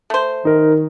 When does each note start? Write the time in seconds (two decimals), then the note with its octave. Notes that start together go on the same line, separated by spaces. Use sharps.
0.10 A3 C5
0.45 D#3 D#4 A#4